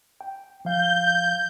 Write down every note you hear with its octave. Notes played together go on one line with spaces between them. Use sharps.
G5
F3 F5 G6